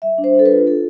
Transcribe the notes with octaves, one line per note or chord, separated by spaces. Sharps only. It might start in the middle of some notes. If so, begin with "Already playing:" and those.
G3 E5
D4
C5
D4 A4
B4
F4
F4 A4